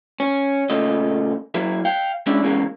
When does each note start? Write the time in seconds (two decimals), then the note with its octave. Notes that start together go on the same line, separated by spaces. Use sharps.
0.20 C#4
0.70 A#2 C#3 A3 D#5
1.54 F#3 A#3 E4
1.85 F5 G5
2.26 G#3 C#4 D4 E4
2.43 E2 G#2 C#3 G#3 A#3 C#4